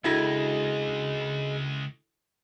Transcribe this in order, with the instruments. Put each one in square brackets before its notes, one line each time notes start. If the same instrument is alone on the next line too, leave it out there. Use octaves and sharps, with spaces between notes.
[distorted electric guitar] C#2 [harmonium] G#3 [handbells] D4 F#4 G#6 [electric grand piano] E4 A4 A#6